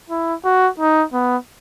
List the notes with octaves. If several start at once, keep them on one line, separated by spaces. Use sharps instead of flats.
E4
F#4
D#4
B3